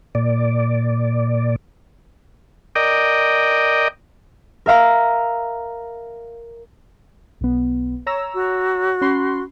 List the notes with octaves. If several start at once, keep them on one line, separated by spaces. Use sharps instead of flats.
A#2 D5
A#4 D5 D#5 G5
A#4 E5 F5 A#5
B1 B3
C#5 A#5 E6
F#4
C#4 B5 C6